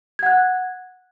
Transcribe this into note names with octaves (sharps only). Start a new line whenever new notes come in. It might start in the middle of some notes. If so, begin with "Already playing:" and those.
F#5 F#6 G#6